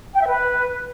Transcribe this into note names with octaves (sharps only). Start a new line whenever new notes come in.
G5
E5
B4